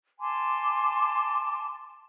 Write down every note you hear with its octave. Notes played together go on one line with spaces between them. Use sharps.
G#5 A5 C6 D6